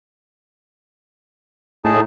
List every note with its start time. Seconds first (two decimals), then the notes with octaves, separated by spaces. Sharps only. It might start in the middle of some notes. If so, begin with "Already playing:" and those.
1.85 A2 D#4 G#4 A5